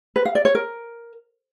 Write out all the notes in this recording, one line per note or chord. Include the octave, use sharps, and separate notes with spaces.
B4
F5
D5
C#5
A#4